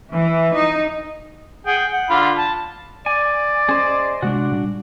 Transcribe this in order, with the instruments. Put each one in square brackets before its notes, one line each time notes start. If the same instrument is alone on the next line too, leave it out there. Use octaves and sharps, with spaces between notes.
[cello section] E3
D#4
[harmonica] G#4 F#5 G5
F#5
D3 F4 B5
A5
[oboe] D5 [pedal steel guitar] G#5
[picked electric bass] C#4 [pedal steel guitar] G#4 C5 D#5
[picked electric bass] C3 G#3 [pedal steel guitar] D4 F#4
[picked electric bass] A#2 G3